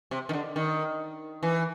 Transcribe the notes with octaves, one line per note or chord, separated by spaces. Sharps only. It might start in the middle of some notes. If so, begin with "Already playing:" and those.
C3
D#3
D3
D#3
E3